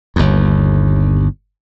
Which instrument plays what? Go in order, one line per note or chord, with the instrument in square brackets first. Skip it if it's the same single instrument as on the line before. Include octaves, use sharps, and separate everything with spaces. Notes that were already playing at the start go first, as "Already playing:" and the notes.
[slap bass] G1 D#2